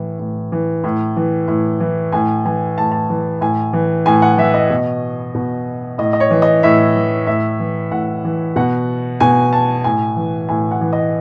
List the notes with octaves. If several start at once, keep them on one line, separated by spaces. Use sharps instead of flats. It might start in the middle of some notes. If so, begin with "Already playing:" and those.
Already playing: A2 E3
A2
E3
A2
E3
A2
E3
A2 G#5
E3 G#5
A2 A5
A5
E3
A2 G#5
E3
A2 G#5
F#5
E3 E5
D#5
B2
B2
A2 D#5
D#5
C#5
E3
D#5
A2 E5
E3
A2 E5
E3
A2 F#5
E3
B2 F#5
B2 G#5
A5
A2 G#5
E3
A2 G#5
F#5
E3
D#5